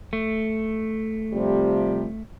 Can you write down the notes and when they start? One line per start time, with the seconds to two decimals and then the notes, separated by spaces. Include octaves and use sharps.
0.13 A3
1.33 C3 F3 G3